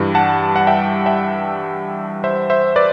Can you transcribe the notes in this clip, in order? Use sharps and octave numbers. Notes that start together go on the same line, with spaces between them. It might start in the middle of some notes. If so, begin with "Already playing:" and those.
Already playing: G2 E3 G3
F#5 A5
F#5
E5 G5
E5 G5
C5 E5
C5 E5
B4 D5